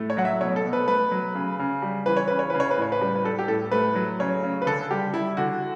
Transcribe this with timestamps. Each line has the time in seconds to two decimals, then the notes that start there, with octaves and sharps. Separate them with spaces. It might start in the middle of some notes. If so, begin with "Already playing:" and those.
Already playing: A2 A3
0.10 C#5
0.17 F#3 F#5
0.25 E5
0.41 B2 C#5
0.56 A4
0.65 B2
0.73 B4
0.88 A3 B4
1.11 F#3
1.35 C#3
1.59 C#3
1.82 G3
2.06 E3 B4
2.17 C#5
2.28 C#3 B4
2.39 C#5
2.50 C#3 B4
2.60 C#5
2.71 B4
2.77 A2 C#5
2.92 B4
3.01 G3
3.16 B4
3.25 G3 A4
3.39 G4
3.48 A2 A4
3.71 A3 B4
3.95 F#3
4.20 C#3 C#5
4.43 C#3
4.62 B4
4.66 D3 A4
4.91 G3 G4
5.13 G3 E4
5.37 D3 F#4